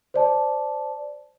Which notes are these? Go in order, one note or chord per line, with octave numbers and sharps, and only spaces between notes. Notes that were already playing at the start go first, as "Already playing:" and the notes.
C5 D5 A5